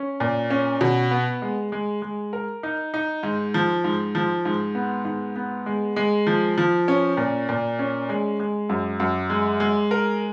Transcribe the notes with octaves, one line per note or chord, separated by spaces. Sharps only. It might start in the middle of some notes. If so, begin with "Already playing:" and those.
Already playing: C#4
A#2
C#4
B2
B3
G#3
G#3
G#3
A#4
D#4
D#4
G#2
F3
G#2
F3
G#2
B3
G#2
B3
G#3
G#3
F3
F3
C#4
A#2
A#2
C#4
G#3
G#3
F#2
F#2
G#3
G#3
A#4